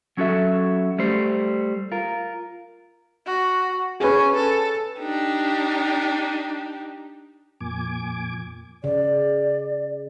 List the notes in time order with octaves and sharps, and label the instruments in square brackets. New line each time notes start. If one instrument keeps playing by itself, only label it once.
[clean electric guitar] F#3 C#4 F#4 A4 E5
G3 A3 C5
F4 A#4
[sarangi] F#4
[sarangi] C#4 [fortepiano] G#4 B4
[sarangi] A4
[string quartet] D4 D#4 G4
[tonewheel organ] F2 A#2 G#5 D6
[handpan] C#3 [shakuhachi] D5